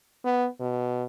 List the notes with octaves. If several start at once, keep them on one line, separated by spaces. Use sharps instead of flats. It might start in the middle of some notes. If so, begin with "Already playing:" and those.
B3
B2